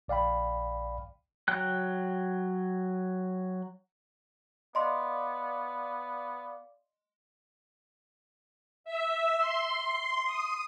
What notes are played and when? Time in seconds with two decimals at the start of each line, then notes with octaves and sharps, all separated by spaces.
0.08 A#1 D5 F5 G5 B5
1.48 F#3 G5 F#6
4.75 B3 D5 D#5 F5 C6 D6
8.84 E5
9.38 C6
10.25 D#6